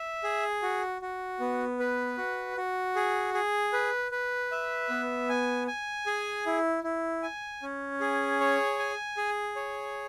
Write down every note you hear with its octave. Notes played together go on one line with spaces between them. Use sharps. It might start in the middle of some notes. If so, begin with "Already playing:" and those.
Already playing: E5
G#4
F#4
F#4
B3
B4
F#4
F#4
G#4
G#4
B4
B4
E5
B3
G#5
G#5
G#4
E4
E4
G#5
C#4
G#4
C#5
G#5
G#4
C#5